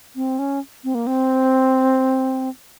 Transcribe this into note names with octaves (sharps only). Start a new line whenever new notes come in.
C4
C#4
C4
A#3
C4